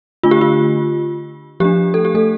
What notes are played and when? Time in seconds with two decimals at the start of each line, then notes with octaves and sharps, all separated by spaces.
0.23 D3 A3 D4 F4
0.31 G4
0.41 F4
1.60 F3 A3 D4 G4
1.94 A4
2.05 G4
2.15 A3 A4